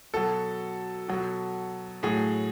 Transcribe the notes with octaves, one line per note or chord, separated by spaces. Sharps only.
B2 F#3 A4
B2 F#3
A2 F#3 G#4